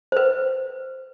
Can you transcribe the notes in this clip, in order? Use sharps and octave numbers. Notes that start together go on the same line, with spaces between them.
B4 C5